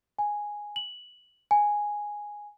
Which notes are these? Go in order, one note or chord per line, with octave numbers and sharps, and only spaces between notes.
G#5
F#7
G#5